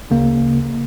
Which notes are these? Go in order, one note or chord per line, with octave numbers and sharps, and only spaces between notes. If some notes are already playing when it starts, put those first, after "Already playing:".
D2 C#3 A#3